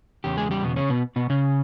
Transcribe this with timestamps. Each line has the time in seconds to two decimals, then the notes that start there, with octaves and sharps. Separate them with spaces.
0.24 E2 C#3 G4
0.37 G#3 G#4
0.51 G3 G4
0.63 B2 B3
0.76 C#3 C#4
0.89 B2 B3
1.16 B2 B3
1.30 C#3 C#4